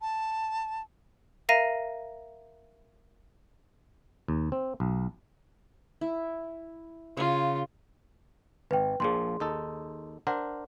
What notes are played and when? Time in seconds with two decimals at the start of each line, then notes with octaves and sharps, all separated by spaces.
0.01 A5
1.49 A#4 E5 F5 A#5 A#6 D#7
4.28 D#2
4.52 C4
4.80 B1
6.01 E4
7.17 C#3 F4 G#5
8.71 G#1 B4 G5
9.00 A#1 A#2 F3 G#4 C6
9.40 D#2 D#4 A4
10.27 D4 A#4 C5 F#5